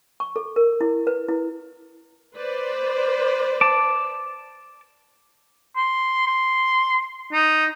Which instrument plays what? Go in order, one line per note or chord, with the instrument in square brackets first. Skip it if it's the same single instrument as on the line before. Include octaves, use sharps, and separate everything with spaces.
[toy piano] C#6
A4
A#4
E4
B4
E4
[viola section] B4 C5 D5
[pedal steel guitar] A5 D6
[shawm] C6
C6
D#4